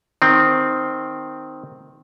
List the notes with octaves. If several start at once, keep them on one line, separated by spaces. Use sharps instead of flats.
D#3 C4